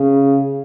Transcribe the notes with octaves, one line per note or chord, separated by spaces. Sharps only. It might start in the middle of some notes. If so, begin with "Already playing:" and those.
Already playing: C#3